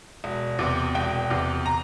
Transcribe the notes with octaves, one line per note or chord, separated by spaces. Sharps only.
E1
E2 C3
E1 G5
E2 C3
A#5